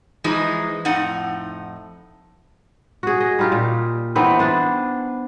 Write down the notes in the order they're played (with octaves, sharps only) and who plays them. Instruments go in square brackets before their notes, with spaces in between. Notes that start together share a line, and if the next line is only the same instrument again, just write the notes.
[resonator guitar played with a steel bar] E3 F3 G#3 D#4
F2 A2 D#4 F#5
[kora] F#4 G#4
D#5
G3 D#4 F4 G4
A#2
E3 B3 C4 D#4
B3 D4 C5